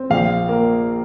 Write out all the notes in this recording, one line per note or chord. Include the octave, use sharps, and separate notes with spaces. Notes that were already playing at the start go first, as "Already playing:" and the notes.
Already playing: C4
A#1 F5
A#3